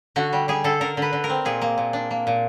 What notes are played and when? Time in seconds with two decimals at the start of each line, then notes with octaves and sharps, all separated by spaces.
0.16 D3 F#4
0.33 G3
0.48 G3 G#4
0.64 D3 A4
0.81 D3 A#4
0.97 D3 B4
1.13 D3
1.24 A#4
1.29 C4
1.45 A#2 G#4
1.62 A#3
1.78 A#2
1.93 D4
2.11 A#3
2.27 A#2